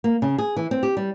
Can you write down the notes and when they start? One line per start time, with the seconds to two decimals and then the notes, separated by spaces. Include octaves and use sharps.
0.04 A#3
0.22 C#3
0.38 G#4
0.56 E3
0.71 C4
0.83 G4
0.97 G3